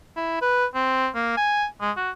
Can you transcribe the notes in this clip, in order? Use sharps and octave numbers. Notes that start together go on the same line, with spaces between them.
E4
B4
C4
A#3
G#5
G#3
F#4